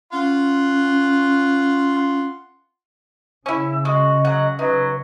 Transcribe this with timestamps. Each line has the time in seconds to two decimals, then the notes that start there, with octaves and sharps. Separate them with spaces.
0.12 C#4 F4 F#5 C6
3.46 C#3 C#4 E4 E6
3.85 G#3 F#4 D#5
4.25 F#3 F#5
4.59 F#3 D#4 B4